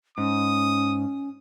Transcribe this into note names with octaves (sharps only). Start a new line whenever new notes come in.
G#2 C#4 D#6